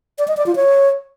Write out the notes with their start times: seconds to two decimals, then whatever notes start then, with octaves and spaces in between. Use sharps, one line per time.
0.18 D5
0.28 D#5
0.37 D5
0.46 F4
0.56 C#5